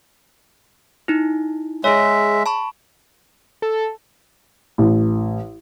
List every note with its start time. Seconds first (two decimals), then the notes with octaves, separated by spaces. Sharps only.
1.08 D#4 E4
1.84 G#3 G#4 C#5 E5
2.46 A5 B5 C#6
3.62 A4
4.78 A1